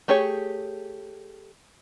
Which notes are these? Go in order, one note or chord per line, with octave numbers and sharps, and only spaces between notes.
A3 G4 G#4 C#5